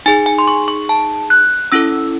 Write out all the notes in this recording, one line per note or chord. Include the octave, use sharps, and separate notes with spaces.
D#4 G#4 G#5
G#5
C6
C#6
C#6
A5
F#6
C#4 E4 A4 E6